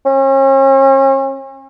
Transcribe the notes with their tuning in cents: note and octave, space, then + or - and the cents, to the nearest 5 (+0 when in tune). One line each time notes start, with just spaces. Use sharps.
C#4 -40